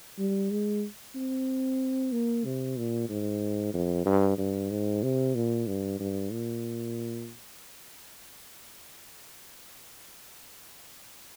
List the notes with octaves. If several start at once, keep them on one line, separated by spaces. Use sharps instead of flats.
G3
G#3
C4
A#3
C3
A#2
G#2
F2
G2
G2
G#2
C3
A#2
G2
G2
A#2